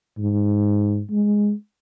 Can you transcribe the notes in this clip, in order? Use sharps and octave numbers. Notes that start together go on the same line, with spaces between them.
G#2
G#3